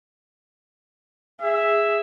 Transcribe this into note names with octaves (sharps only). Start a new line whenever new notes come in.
G#4 E5